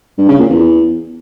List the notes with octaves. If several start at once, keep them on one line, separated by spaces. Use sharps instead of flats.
G2
C#3
A#2
E2